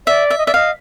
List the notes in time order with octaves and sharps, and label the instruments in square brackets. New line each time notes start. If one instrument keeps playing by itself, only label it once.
[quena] D5 [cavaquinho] E5
[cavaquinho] E5
[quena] D#5
[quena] D5 [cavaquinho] E5
[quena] D#5 [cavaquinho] F5